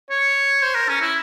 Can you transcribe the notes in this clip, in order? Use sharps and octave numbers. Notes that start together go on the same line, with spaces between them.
C#5
C5
A#4
C#4
E4